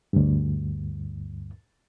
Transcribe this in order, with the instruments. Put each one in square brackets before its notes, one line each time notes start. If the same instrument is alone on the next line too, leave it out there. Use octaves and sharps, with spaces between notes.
[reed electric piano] D2 G2